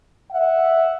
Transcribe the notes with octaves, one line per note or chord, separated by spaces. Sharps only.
E5 F#5